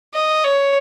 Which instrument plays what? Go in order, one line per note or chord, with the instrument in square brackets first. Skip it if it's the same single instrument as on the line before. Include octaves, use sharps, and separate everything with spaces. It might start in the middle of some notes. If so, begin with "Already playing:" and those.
[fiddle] D#5
C#5